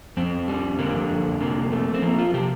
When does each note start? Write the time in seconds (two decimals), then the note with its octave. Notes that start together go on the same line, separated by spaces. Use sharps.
0.17 F2 C4
0.48 G3
0.79 D3 A#3
1.09 F2
1.41 C3 A#3
1.72 A3
1.94 C4
2.02 F3 A#3
2.18 F4
2.34 C3 G4